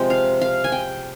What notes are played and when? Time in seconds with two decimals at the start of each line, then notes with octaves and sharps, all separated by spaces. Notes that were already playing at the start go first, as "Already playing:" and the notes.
Already playing: C3 F3 G#3 G5
0.10 F5
0.41 F5
0.64 G#5
0.72 G5